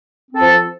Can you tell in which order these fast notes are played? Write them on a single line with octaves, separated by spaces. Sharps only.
C4 A4 F3